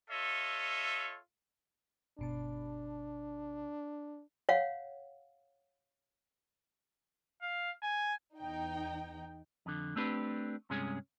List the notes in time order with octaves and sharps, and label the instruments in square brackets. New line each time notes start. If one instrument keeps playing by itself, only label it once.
[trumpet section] F4 A4 C#5 D#5 E5
[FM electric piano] G1 B2 A5 [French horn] D4
[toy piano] C#5 F5 F#5
[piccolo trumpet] F5
G#5
[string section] E2 D#4 G5
[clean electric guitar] F2 D3
A3 C4 D4 G4 B4
G2 C3 G#3 C#4 G#4